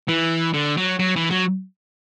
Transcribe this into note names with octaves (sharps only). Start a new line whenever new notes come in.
E3
D3
F#3
F#3
E3
F#3